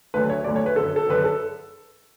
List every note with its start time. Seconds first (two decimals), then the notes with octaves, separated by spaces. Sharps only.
0.14 D2 D3 F#3 B4
0.30 C#5
0.44 D2 D3 F#3 D5
0.56 C#5
0.66 B4
0.76 F#2 D3 F#3 A4
0.96 A4
1.07 F#2 D3 F#3 B4
1.24 A4